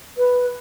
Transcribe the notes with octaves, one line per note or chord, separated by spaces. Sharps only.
B4